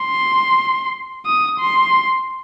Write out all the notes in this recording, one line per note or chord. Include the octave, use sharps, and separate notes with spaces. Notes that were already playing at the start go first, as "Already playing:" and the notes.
Already playing: C6
D#6
C6